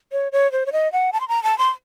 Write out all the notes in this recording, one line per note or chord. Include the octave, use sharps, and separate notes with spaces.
C#5
C#5
C5
C#5
D#5
F#5
A5
C6
A#5
A5
C6